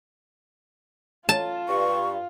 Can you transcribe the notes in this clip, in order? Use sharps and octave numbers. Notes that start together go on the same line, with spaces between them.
F4 A5
G2 C#6